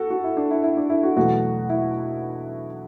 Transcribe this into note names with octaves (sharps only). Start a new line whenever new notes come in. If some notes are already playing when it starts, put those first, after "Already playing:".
Already playing: F#4 A4
F#4
E4
D4
E4
E4
D4
E4
F#4
E2 B2 F#3 A3 F#4
E4